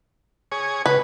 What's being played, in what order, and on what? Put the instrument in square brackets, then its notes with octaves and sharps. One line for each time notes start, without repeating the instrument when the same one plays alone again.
[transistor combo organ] G#4 C#5
[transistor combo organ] C#3 [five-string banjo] B4